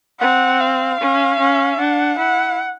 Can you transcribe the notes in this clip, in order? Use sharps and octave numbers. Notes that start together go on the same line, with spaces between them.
C4 F#5
F5
C#4
C#4
D4 F#5
E4 F#5